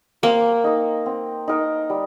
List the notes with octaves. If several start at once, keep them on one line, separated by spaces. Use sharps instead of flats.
A#3 C4
D#4 A#4 D#5
C4
D#4 A#4 D#5
G3